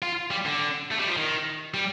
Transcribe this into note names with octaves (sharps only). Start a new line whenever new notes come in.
F4
G3
D3
A3
G3
F3
D#3
G3